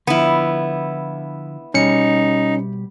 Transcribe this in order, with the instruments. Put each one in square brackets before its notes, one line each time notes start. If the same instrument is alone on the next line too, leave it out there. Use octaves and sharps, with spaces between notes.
[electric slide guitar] D3 F3 [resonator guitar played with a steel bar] B3 E4
[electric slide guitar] B2 G3 G4 [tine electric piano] C#4 C#7 [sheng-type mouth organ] D#4